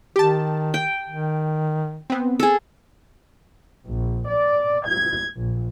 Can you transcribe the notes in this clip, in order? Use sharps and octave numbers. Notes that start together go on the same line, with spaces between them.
D#3 G4 A5
G5
D#3
B3 C4
G#4 A4
A#1
D5
G#6
A#1